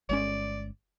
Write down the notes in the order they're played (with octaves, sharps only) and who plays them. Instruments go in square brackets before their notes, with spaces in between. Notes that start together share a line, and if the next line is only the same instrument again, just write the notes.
[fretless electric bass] G1 G#3 C#4 [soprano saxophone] D5